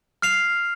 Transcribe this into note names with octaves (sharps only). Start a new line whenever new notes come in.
F6 C7 F7